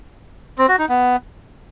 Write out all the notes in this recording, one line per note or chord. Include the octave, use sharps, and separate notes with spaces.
C4
F#4
D#4
B3